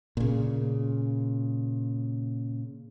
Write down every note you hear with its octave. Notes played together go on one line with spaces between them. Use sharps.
A#2 C#3